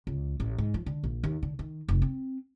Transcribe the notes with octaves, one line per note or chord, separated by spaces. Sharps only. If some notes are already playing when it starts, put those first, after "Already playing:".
C#2
A1
G#2
F3
D3
A#1
D#2
D3
D#3
F1
C4